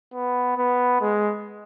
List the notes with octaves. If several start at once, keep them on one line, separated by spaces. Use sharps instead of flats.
B3
B3
G#3